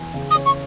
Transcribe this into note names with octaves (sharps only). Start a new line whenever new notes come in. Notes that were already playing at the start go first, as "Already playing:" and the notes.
Already playing: E2
C#3
D#6
C#4
C#6